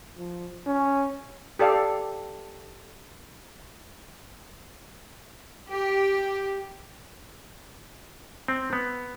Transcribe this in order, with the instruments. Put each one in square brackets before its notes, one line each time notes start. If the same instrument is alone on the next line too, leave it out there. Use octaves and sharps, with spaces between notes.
[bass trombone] F3
C#4
[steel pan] G4 A4 D5 F5
[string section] G4
[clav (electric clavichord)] C4
B3